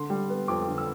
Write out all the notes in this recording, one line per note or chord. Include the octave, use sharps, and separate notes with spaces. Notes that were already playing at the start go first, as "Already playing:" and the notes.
Already playing: D3 C6
G3
B3
F2 D6
D3
E6